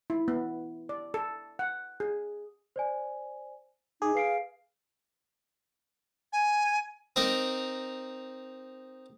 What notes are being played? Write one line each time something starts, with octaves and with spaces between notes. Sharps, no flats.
E4
B3
D5
A4
F#5
G#4
C5 D5 G#5
D#4 G#4 D6
B4 F5 C7 D7
G#5
C4 D#4 A#4